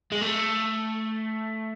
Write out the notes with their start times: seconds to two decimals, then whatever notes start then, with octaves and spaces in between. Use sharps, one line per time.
0.12 G#3
0.21 A3